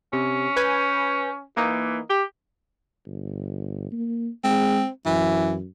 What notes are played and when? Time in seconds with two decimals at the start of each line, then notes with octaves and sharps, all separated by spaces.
0.13 C3 C#4
0.56 B4 G#5 G6
1.57 E3 A#3 D#4
2.10 G4
3.07 G1
3.92 A#3
4.44 G#3 C4
5.06 F#2 E3